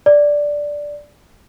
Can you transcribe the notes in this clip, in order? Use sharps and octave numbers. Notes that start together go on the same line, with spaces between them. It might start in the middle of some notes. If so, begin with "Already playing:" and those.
D5